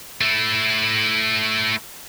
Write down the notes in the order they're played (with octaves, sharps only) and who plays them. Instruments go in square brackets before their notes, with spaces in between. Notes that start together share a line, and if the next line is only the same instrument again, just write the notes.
[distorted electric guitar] A3 E4